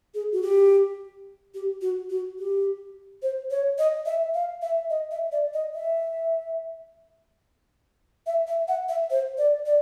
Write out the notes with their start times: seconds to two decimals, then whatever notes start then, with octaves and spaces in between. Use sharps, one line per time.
0.15 G#4
0.32 F#4
0.42 G4
1.54 G4
1.82 F#4
2.10 F#4
2.39 G4
3.23 C5
3.51 C#5
3.78 D#5
4.06 E5
4.34 F5
4.62 E5
4.90 D#5
5.11 E5
5.32 D5
5.54 D#5
5.74 E5
8.27 E5
8.47 E5
8.68 F#5
8.89 E5
9.11 C5
9.38 D5
9.66 D5